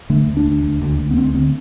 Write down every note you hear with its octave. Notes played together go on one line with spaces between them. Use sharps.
D3 A3
D2
D4
D2
D2
D2
D2
B3
D2 C4
D3 C4